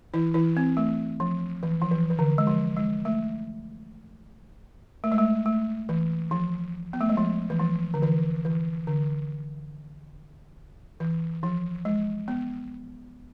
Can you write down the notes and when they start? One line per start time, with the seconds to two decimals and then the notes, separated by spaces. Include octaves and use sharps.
0.14 E3 E4
0.34 E3 E4
0.57 C4
0.77 A3
1.20 F3
1.63 E3
1.81 F3
1.91 E3
2.10 E3
2.19 D3
2.38 G#3
2.47 F3
2.76 G#3
3.05 A3
5.04 A3
5.12 G#3
5.18 A3
5.46 A3
5.89 E3
6.31 F3
6.93 B3
7.01 A3
7.09 G#3
7.17 F3
7.50 E3
7.60 F3
7.94 D3
8.03 E3
8.45 E3
8.87 D3
11.00 E3
11.43 F3
11.85 G#3
12.28 B3